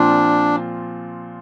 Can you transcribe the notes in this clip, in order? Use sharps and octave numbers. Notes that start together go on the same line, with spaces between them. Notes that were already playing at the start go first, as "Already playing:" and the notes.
Already playing: A#2 F3 C4 D4 F4